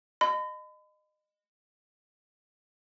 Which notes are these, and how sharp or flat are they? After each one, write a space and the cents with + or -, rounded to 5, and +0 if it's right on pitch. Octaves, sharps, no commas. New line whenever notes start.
D#5 -25 B5 +40